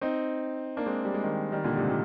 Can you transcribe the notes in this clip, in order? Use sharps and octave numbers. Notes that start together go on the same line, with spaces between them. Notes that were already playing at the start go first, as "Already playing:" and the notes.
C4 D#4
A#3 D4
G#3 C4
G3
G#3
D#3 G3
D#3 G3
A#2 D3
G#2 C3
A#2